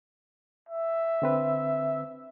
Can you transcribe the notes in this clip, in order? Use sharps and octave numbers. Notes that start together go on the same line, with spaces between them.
E5
D3 C4 B4